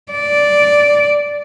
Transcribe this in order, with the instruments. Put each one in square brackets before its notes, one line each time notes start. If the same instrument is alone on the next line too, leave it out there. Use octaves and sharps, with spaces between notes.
[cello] D5